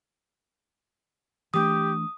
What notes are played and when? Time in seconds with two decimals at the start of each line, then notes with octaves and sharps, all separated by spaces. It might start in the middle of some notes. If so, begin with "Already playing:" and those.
1.54 E3 A3 D4 G4 D#6